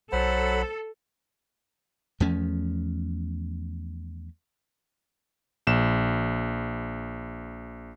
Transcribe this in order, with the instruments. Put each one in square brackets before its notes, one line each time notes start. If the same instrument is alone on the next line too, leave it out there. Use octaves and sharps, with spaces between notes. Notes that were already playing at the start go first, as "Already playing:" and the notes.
[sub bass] B1 [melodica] F#3 F#5 B5 [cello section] A4 [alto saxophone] C5
[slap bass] E2 F3 A3 C#4
[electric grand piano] A#1 E7